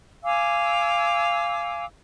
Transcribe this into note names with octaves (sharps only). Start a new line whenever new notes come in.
F5 G#5 D6 E6